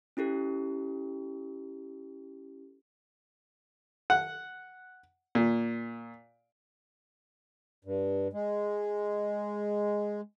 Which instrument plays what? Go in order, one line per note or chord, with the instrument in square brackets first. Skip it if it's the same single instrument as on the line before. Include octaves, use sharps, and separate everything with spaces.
[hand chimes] C#4 E4 G4 A4
[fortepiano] F#5
A#2
[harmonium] G2
G#3